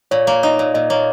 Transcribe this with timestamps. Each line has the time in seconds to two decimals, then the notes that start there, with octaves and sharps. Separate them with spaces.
0.11 A#2 C#5
0.27 A#3
0.43 D#4
0.59 A#2
0.74 A#2 D#5
0.90 A#3 C#5